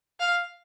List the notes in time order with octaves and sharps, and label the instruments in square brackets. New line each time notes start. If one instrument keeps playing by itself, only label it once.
[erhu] F5